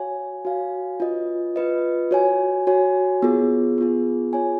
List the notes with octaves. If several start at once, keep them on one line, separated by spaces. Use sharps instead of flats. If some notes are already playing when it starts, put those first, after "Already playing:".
Already playing: F#4 C#5 F5 G#5
F#4 C#5 F5 G#5
F4 B4 D#5
F4 B4 D#5
F#4 C#5 G#5
F#4 C#5 G#5
B3 F4 G#4
B3 F4 G#4
F4 G#4 C#5 G#5